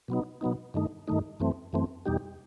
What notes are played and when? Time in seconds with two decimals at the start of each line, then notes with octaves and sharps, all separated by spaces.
0.08 B2 F#3 B3 D#4
0.41 B2 F#3 B3 D#4
0.74 G2 D#3 A3 D#4
1.08 G2 D#3 A3 D#4
1.40 F#2 E3 A3 C4
1.73 F#2 E3 A3 C4
2.06 E2 B2 G3 D#4 G4